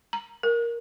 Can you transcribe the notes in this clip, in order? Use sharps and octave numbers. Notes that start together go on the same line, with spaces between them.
A#5
A#4